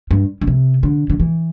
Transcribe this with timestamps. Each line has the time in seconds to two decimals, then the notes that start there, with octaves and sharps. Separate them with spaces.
0.11 G2
0.41 D3
0.47 C3
0.83 D3
1.10 D3
1.20 E3